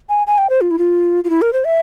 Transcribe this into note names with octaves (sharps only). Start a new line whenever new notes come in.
G#5
G#5
G5
C5
F4
E4
F4
F4
E4
A#4
C5
E5